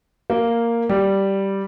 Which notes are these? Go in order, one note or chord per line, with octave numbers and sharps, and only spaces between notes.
A#3
G3